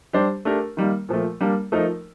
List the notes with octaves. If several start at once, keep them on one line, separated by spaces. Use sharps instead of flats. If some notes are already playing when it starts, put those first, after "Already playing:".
G3 D4 G4 C5
A3 D4 G4 A#4
D#3 G3 A#3
A#2 F3 A3
G3 A#3 D4
F3 A3 D#4 A#4